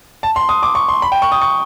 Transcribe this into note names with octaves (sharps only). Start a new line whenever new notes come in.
A5
C6
D#6
D6
C#6
C6
B5
G5
C#6
D#6
C#6